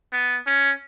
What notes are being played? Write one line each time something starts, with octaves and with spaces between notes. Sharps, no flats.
B3
C#4